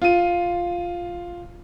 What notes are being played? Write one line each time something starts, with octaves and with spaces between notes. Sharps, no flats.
F4 D#7